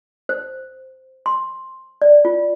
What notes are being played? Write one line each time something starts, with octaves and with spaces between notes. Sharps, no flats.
C5
C6
D5
F4